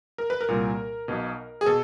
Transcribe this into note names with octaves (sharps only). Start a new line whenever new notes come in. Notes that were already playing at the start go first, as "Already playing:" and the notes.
A#4
B4
A#4
C2 A#2
B1 B2
G#4
B2 A4